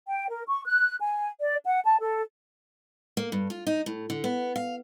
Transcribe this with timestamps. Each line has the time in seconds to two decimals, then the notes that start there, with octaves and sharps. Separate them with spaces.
0.06 G5
0.28 A#4
0.47 C#6
0.66 F#6
1.00 G#5
1.40 D5
1.65 F#5
1.84 A5
1.99 A4
3.17 A#3
3.32 G2
3.50 F4
3.67 D#4
3.86 A2
4.10 D3
4.24 B3
4.56 F5